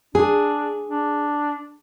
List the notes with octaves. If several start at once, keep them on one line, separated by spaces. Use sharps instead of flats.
D4 G#4
D4